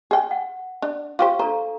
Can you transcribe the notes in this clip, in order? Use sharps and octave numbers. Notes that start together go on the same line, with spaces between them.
G#4 G5
F#5
D4
F4 G4 C5 F5 C#6
D4 A4 C5 A#5